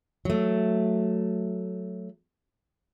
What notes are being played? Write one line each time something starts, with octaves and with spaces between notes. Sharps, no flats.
F#3 A3